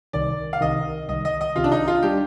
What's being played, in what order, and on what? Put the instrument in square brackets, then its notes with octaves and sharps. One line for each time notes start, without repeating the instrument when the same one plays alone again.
[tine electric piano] C2 C3 D#3 [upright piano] D5
[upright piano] F5
[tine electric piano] C2 C3 D#3 [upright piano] D#5
[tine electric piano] C2 C3 D#3 [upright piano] D#5
[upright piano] D#5
D#5
[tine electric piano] C2 C3 D#3 [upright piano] F4
[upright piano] D4
D#4
F4
[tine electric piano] G3 D4 [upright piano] G4